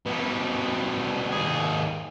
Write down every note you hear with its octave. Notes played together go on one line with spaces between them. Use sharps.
B2 G3
D#2 G#4